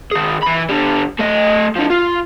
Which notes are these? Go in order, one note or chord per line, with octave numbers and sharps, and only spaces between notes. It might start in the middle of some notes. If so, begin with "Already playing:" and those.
D#3 G#4
E3 B5
D3 G3
A3 D#5
D3 F3
F4